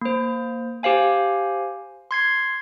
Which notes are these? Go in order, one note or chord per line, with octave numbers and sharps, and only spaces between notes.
A#3 C5
G4 C5 F5 G#5
C6 G#6 C7